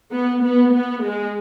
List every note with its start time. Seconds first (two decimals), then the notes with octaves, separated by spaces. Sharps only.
0.11 B3
0.42 B3
0.72 B3
1.03 G#3